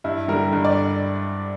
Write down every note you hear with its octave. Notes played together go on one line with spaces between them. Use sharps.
G2 E4
D3 G3 A#4
G2
D5